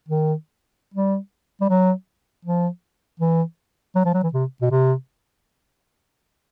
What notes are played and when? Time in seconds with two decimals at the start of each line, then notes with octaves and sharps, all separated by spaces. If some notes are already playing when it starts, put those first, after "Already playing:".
0.08 D#3
0.94 G3
1.61 G3
1.69 F#3
2.45 F3
3.20 E3
3.95 F#3
4.05 F3
4.14 F#3
4.23 E3
4.33 C3
4.62 B2
4.71 C3